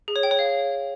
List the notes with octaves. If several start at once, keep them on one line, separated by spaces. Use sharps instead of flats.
G#4
C#5
G5
C#5
F5